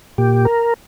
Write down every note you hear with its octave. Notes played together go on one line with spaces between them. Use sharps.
A#2 G4
A#4